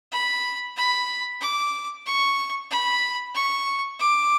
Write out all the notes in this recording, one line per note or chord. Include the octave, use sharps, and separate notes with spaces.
B5
B5
D6
C#6
B5
C#6
D6